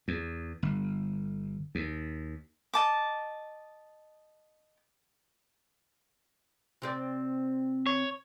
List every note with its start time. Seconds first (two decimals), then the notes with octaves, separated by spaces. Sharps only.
0.08 E2
0.63 G1
1.75 D#2
2.74 D#5 A5 D6
6.82 C3 C4 D5
7.86 C#5